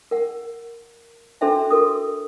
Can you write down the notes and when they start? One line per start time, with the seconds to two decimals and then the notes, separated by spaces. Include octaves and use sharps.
0.11 A#4 F#5
1.41 D4 F#4 A4 C5 E5 G5
1.70 F#4 A4 A#4 D#6